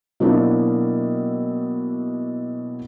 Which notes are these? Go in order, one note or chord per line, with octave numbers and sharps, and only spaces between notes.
B2 F#3 A#3 C4 D4 E4